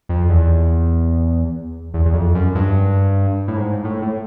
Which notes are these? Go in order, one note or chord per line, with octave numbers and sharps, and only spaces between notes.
F2
E2
E2
E2
F2
F#2
G2
A2
G#2
A2
A2